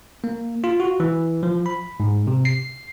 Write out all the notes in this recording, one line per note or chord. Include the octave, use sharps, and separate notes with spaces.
A#3
F4
F#4
E3
F3
B5
G#2
C3
C7